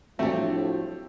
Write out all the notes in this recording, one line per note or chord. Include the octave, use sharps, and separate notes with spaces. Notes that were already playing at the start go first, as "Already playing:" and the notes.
A2 F3 F#3 A3 C4 D4 G4